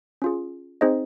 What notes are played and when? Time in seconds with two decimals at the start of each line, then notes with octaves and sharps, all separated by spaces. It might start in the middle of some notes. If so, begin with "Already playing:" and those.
0.22 C#4 F4 G#4
0.81 C4 D#4 G#4 C5 D#5